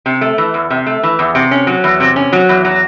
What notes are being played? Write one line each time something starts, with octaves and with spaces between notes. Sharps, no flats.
C3
A3
E3
E2
C3
A3
E3
E2
C3
C#4
F#3
E2
C3
C#4
F#3
E2
F#3